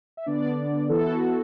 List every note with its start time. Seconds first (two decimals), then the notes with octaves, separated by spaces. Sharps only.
0.17 E5
0.26 D3 B3 D4 D5
0.89 E3 B3 E4 A4
1.04 F#4
1.21 A4